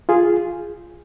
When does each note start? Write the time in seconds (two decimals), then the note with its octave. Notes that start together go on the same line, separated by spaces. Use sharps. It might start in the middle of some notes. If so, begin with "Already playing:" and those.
0.09 F4 G#4